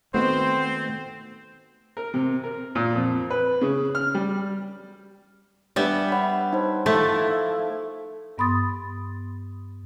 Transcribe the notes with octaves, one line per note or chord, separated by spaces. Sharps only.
D#3 A3 B3 C4 F#4 C5
A#4
C3
A#4
A#2
F2
B4
C#3
F6
G3
G3 B3 D4 E5
C#5 F#5 B5
D#4 C5
F3 A3 E4
G2 B3 B5 C6 D#6 A6